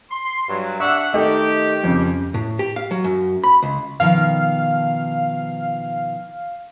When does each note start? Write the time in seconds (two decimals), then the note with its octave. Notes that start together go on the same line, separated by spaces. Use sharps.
0.10 C6
0.48 G2 F#3
0.80 D4 E5 F#5 C#6
1.14 D#3 A3 D#4 G4
1.84 F2 C#3
2.34 A2
2.59 G4
2.76 F5
2.91 F#3
3.04 F#2
3.44 B5
3.63 C#2
4.00 B2 D#3 F3 F5